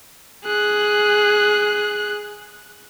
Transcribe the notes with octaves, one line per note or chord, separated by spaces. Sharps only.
G#4 F#6